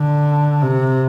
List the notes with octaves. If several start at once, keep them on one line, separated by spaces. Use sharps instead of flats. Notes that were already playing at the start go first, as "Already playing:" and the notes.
Already playing: D3
C3